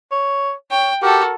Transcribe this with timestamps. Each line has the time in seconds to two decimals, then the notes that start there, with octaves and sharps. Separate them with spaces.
0.12 C#5
0.71 C#5 G5
1.02 F#4 G4 A4 A#4